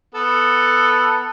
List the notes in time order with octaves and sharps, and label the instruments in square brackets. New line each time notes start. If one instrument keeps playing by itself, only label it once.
[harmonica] B3 A4